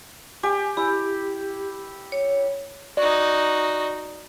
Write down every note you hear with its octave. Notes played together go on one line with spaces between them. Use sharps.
G4 G#5
E4 G4
C#5
D#4 F#4 D5